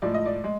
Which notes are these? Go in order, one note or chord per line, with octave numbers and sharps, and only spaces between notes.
A2 F3 G#3 D5
D#5
D5
G#3